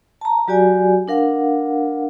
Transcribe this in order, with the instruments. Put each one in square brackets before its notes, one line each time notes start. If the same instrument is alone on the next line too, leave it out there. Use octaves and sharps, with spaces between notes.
[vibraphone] A5 A#5
F#3 F#4 G4 D5 G#5
D4 A#4 F5 F#5